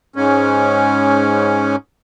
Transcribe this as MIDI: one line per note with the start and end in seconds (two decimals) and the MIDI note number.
0.16 1.76 44
0.16 1.76 61